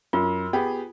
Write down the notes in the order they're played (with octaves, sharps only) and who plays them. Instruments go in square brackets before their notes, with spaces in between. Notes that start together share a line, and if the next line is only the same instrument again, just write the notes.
[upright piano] F#2 [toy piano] F4
[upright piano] B3 G4 G#4